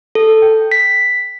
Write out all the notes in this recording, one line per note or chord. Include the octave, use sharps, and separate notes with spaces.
A4
G5
B6